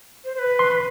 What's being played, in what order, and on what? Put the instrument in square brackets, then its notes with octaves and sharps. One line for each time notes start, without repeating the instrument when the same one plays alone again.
[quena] C5
C5
B4
[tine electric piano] C6